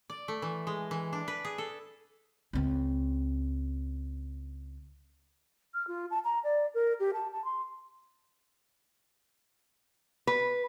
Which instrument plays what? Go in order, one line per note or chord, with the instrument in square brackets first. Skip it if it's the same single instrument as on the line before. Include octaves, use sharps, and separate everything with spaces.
[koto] D5
A3
E3
G#3
E3
D4
B4
G#4
A4
[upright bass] C#2 C4
[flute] F6
F4
A5
A#5
D5
A#4
G4
A5
A5
C6
[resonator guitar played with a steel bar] B4